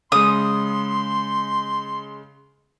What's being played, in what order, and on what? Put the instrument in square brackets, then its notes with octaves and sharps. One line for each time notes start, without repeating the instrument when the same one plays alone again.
[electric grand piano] C#3 G#3 [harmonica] C6 [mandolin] D#6